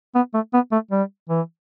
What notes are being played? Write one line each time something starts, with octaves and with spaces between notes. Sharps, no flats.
B3
A3
B3
A3
G3
E3